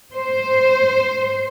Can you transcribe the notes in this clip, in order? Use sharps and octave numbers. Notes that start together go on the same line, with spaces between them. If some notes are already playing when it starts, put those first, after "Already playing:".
C5